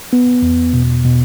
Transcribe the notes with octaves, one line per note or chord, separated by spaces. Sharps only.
B3
E2
B2
B2